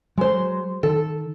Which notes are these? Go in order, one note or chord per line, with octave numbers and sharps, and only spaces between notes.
F#3 G#3 C5
D#3 A4